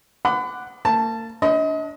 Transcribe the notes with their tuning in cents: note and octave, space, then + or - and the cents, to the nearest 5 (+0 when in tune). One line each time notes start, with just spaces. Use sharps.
F#5 +0 B5 +35 D6 +0
A#3 -40 A5 +0
D4 -20 D#5 +35 B5 +40